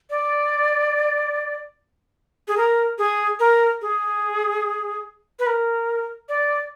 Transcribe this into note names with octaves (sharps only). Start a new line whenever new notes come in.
D5
G#4
A#4
G#4
A#4
G#4
B4
A#4
D5